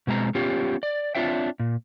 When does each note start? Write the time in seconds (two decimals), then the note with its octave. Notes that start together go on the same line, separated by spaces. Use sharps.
0.07 B2 G#3 C4 A#5
0.35 B3 C#4 F4 G4 C#5
0.83 D5
1.15 C4 D4 F4 C#5 E5 G5
1.60 A#2